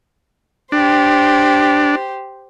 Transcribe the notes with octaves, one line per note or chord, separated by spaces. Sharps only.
D4 G4 C5